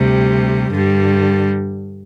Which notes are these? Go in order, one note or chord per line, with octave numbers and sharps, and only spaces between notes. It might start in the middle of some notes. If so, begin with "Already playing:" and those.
Already playing: D2 C3 G3
G2 D3 G3